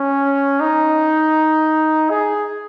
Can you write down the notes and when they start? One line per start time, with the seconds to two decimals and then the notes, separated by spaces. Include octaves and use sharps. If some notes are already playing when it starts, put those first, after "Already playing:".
Already playing: C#4
0.60 D#4
2.10 G#4